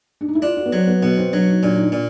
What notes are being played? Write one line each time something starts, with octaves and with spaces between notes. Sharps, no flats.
D4
D#4
E4
D4 F4
F#4
B3
F#3 C4
B3
B2 B3
C4
F#3 D4
D#4
A#2 D4
D#4
D4
A#2